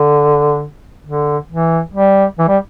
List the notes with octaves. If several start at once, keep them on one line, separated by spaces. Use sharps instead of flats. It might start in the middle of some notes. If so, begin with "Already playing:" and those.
Already playing: D3
D3
E3
G3
E3
G3